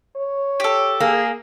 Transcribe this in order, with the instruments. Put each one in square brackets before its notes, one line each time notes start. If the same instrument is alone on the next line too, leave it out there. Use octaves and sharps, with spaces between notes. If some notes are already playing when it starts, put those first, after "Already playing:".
[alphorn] C#5
[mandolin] G4 A4
[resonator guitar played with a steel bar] A#3 [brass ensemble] G#4